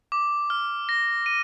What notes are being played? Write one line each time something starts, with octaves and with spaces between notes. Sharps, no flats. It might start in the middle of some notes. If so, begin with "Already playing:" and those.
D6
F6
A#6
D#7